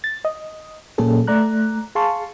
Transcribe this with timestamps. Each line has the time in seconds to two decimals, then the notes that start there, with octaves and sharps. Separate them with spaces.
0.04 A6
0.25 D#5
0.98 A#2 F#3 A#3 C#4 G#4 A4
1.27 A3 D5 A#5 F#6
1.95 G#4 F5 A5 C6 C#6